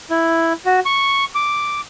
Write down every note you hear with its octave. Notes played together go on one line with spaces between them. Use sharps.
E4
F#4
C#6
D6